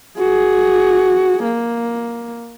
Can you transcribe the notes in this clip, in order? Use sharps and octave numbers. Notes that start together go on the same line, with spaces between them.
F#4 G#4
A#3